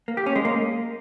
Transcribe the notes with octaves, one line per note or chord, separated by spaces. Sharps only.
A#3
G4
C#4
G#3
A#3